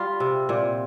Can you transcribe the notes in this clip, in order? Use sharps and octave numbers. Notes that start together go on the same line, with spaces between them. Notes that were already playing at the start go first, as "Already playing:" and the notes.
Already playing: G3 F4
C3
A#2